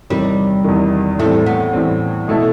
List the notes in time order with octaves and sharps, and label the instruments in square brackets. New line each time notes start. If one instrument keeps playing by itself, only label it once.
[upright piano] E2 C3 D#3 [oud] G3
[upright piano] E2 C3 D#3
[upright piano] A2 E3 G3 C4 [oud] A3
[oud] B3
[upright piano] A2 E3 G3 C4
B2 A3 E4 A4